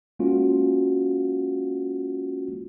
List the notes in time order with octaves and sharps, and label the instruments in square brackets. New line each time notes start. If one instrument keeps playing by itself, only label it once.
[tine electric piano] G#3 A#3 C#4 F4 F#4